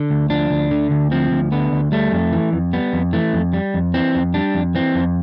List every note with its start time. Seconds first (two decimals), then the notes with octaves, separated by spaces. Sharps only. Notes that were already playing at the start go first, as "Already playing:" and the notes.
Already playing: D3
0.10 D2
0.30 F3 D4
0.50 D2
0.71 D3
0.91 D2
1.11 F3 C4
1.31 D2
1.52 D3 B3
1.72 D2
1.92 G3 A3
2.12 F2
2.33 E3
2.53 F2
2.73 G3 B3
2.93 F2
3.13 E3 A3
3.33 F2
3.53 G3
3.74 F2
3.94 E3 C4
4.14 F2
4.34 G3 D4
4.55 F2
4.75 E3 C4
4.95 F2